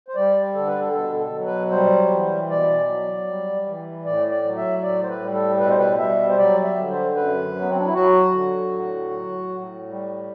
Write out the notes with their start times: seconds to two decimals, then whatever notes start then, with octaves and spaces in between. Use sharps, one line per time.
0.08 C5
0.15 G3 D5
0.54 D3 A4
0.67 B4
0.80 A4
0.93 B2 A4
1.19 A4
1.32 F#3
1.45 B4
1.71 G3 C5
2.10 E3
2.49 B2 D5
2.88 F#3
3.27 G3
3.66 E3
4.05 A2 D5
4.31 D5
4.44 F#3
4.57 E5
4.82 A2 D5
5.03 C5
5.09 B4
5.21 G3
5.34 A4
5.60 B2 B4
5.69 C5
5.78 B4
5.99 G3 E5
6.29 C5
6.38 F#3 D5
6.63 E5
6.76 D3
6.90 C5
7.16 F#2 B4
7.54 F#3
7.61 B3
7.69 C4
7.77 D4
7.86 E4
7.93 F#3 F#4
8.32 D3
8.71 A2
9.10 F#3
9.49 A2
9.88 G3